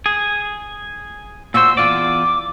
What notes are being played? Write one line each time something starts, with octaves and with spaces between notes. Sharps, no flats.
G#4
A#2 F#4 C5 E6
E2 F4 D5 D6